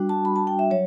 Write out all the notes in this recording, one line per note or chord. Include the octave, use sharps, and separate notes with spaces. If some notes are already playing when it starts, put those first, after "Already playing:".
Already playing: G3 D4 F#4
A5
B5
A5
G5
E5
F#3 C#5